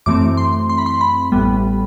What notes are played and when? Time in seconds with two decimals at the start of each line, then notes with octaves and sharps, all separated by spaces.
0.06 F#2 E3 A3 C4 D6
0.37 C6
0.69 C6
0.78 B5
0.86 C6
1.01 B5
1.32 A1 A2 G3 B3